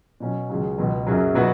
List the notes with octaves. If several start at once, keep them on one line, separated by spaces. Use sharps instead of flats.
B2 F#3 C#4
C#2 C#3 F#3
C#2 B2 F#3 B3
F#2 C#3 F#3
B2 F#3 B3 F#4